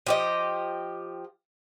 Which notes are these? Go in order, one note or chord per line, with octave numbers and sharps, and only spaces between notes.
F3 G4 D#5